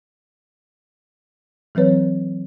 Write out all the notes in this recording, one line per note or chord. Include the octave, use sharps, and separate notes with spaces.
E3 F#3 C4 B4 C#5